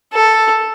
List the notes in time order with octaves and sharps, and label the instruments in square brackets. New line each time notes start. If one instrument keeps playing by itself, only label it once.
[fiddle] A4